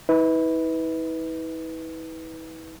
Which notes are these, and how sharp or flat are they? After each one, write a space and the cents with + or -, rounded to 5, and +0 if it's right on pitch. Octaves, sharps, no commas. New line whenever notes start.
E4 -45 B4 +0